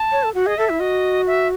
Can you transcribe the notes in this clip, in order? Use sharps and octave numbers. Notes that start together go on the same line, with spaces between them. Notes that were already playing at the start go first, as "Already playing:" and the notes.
Already playing: A5
C#5
A4
F#4 F#5
G#4 D#5
A4 E5
E4
F#4 D#5
E5